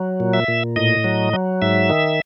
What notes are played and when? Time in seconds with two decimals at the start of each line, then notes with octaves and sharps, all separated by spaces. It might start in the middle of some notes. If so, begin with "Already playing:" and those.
Already playing: F#3
0.20 A#2
0.33 E5
0.48 A#2
0.76 A2 D#5
1.04 F#3
1.33 F#3
1.62 G#2 E5
1.90 D#3